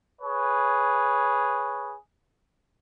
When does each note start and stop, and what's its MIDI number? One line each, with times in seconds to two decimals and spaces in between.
0.21 1.93 68
0.21 1.93 71
0.21 1.93 73